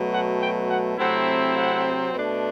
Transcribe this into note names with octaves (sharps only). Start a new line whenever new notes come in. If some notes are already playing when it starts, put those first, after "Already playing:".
Already playing: B2 F#3 A3
F#5
G5
F#5
C3 F#3 A3 C4 E4 F#5
F#5
B2 A3 D4